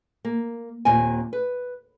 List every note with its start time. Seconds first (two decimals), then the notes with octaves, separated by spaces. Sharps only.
0.25 A#3
0.85 D#2 A#2 C4 G#5
1.33 B4